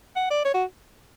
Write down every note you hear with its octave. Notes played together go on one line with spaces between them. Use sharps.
F#5
D5
C#5
F#4